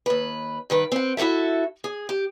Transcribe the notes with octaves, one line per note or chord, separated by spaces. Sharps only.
D#2 B4
G2 D#3 B4
C4 F#5
E4 F#4 G4 A4 E5
G#4
G4